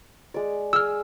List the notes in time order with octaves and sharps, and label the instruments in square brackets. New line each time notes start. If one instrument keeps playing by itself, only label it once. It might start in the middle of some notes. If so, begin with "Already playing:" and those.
[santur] G#3 D5
[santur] G#4 [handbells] E6 F6